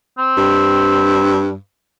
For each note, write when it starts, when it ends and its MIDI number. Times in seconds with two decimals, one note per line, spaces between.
0.18 1.43 60
0.37 1.56 43